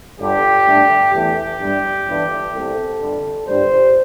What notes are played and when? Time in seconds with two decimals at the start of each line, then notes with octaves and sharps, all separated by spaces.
0.19 G1 G2 D3 G4
0.66 G2 D3 A3
1.13 E2 E3 A3 G4
1.60 G2 G3
2.06 G1 G2 E3
2.54 C2 C3 A3 A4
3.01 G1 G2 D3 G3
3.48 G1 G2 G3 C5